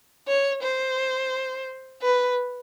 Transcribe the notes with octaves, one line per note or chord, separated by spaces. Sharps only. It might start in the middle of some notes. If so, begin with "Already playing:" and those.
C#5
C5
B4